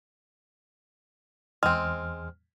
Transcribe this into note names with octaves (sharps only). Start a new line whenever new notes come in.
E2 G#3 C4 F6